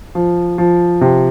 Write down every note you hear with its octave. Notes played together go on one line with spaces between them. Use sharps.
F3
F3
C3